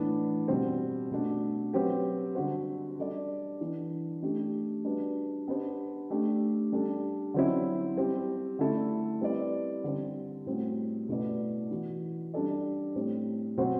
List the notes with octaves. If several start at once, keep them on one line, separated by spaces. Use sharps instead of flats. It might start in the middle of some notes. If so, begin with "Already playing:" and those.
Already playing: A2 E3 B3 D4
B2 G3 C4
B2 A3 D4
F#3 C4 G4 B4
D3 G3 D4 F#4 C5
G3 D4 A4 D5
E3 B3 D4
A3 D4 G4
G3 D4 F#4 B4
B3 D4 G4 C5
A3 D4 G4
G3 D4 A4
D3 F#3 C4 E4
G3 C4 G4
D3 A3 E4 A4
G3 C4 E4 B4 D5
D3 G3 C4
A2 G3 C4 F#4
B2 A3 E4 B4 D5
E3 B3 F#4
G3 D4 A4 D5
A2 G3 C4
B2 F#3 C4 F#4 C5